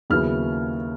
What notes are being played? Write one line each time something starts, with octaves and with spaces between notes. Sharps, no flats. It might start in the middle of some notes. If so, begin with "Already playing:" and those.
D#2 C#3 F#3 B3 E4 F6